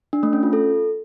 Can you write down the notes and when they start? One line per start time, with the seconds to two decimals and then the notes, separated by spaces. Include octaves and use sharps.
0.13 D4
0.23 A3
0.33 C#4
0.43 F4
0.53 A4